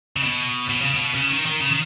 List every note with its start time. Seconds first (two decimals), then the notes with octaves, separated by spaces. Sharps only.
0.17 C#3
0.24 B2
0.69 B2
0.82 C#3
0.94 B2
1.14 C#3
1.30 D#3
1.46 D#3
1.60 C#3
1.70 D#3